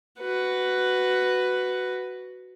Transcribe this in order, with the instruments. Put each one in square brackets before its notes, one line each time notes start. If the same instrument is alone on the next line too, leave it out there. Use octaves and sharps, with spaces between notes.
[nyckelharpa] F#4 B4